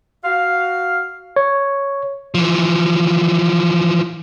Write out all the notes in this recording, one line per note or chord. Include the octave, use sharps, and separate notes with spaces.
F#4 F5
C#5
E3 F3